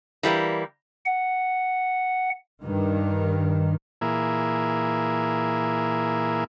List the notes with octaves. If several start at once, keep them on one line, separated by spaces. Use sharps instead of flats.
E3 G3 A3 A#3
F#5
G2 D#3
A#2 E3 A#3 E4 G#4